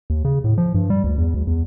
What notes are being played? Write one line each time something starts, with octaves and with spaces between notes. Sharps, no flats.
D#2
C#3
A2
F3
G2
G3
D2
E2
D2
E2